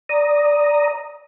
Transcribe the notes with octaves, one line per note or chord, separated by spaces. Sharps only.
D5 A#5 D#6